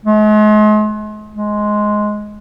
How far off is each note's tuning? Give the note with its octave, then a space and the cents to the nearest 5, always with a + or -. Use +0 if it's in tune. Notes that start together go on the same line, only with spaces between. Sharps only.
G#3 +40
G#3 +10